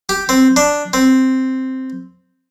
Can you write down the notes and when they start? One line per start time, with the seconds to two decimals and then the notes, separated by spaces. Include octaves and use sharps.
0.09 G4
0.29 C4
0.56 D4
0.93 C4